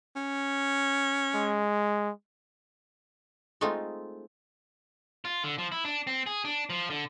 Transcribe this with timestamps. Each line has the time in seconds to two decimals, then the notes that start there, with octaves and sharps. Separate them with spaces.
0.16 C#4
1.35 G#3
3.61 G#3 A3 C4 D#4 F4
5.25 F4
5.44 D3
5.58 F3
5.72 E4
5.85 D4
6.07 C4
6.26 G#4
6.45 D4
6.70 F3
6.90 D3